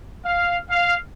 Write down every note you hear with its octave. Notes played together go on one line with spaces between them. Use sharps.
F5
F5